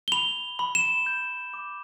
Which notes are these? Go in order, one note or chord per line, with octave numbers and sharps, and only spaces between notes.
G7
B5 F7
B5
E7
G6
D6